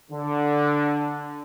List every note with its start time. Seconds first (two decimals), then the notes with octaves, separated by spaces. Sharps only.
0.11 D3